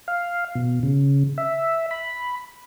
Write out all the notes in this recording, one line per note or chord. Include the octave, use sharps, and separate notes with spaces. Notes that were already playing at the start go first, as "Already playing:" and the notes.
F5
B2
C#3
E5
B5